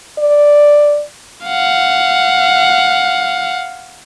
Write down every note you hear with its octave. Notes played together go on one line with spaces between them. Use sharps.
D5
F5 F#5